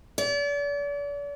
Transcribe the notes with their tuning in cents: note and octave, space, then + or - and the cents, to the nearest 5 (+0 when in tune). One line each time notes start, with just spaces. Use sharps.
D5 -40